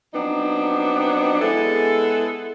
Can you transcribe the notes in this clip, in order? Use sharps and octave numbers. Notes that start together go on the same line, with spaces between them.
F3 F#3 B3 C4 D4 D#4
G#3 B3 E4 G#4 A4